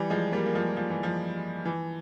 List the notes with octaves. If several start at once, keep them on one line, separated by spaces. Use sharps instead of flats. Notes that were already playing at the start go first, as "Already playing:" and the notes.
Already playing: E3 G3
F3 G#3
G3 A#3
A#3
F3 G#3
F3
E3
F3
E3